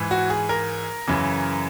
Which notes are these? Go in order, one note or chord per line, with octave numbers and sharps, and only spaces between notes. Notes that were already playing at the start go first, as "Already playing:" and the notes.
Already playing: G#2 E3
F#4
G#4
A#4
F#2 C#3 E3